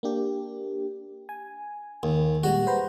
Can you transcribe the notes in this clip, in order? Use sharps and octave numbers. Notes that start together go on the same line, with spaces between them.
A#3 D4 G4
G#5
D#2
A#2 G3 G#3 F#4
B4 C5 A#5